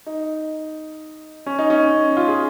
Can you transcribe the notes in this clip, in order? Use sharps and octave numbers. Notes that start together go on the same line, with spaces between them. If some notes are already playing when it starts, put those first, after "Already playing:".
D#4
C#4
D#4
C#4
F4
G#4